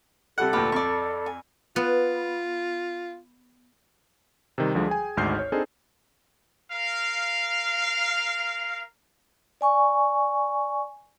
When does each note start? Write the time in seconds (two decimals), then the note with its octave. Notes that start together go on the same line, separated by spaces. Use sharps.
0.38 C3 G3 A4 F#5
0.53 D2 A#2 G4 B4
0.72 F2 D5 C#6
1.26 G#5
1.76 B3 F4
4.58 C3 D#3 G3
4.75 D2 D3 F3 G3 G#3
4.88 G#4 G5 G#5
5.17 G#1 D2 G#2 F6 G6 C7
5.39 C#5
5.52 C4 D4 D#4 G#4 A4 C5
6.72 A#4 F5
9.61 D5 G#5 C#6